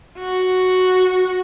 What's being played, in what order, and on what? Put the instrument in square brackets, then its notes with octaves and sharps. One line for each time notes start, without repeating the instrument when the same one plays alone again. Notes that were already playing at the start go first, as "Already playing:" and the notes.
[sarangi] F#4